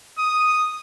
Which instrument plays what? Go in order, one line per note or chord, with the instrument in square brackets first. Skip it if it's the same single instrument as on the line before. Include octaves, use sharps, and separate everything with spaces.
[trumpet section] D#6